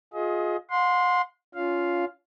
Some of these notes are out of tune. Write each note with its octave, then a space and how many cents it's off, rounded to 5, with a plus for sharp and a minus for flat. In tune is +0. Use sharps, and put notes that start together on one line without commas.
F4 +25 G#4 +10 D#5 +30
F#5 -45 C6 +0
C#4 +25 F4 +0 F5 +0